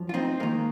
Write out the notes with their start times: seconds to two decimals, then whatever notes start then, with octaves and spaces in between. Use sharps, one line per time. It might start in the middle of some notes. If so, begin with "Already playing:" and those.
Already playing: F#2 F3
0.09 F4
0.14 C4 D#4
0.40 G#2 D#3 A#3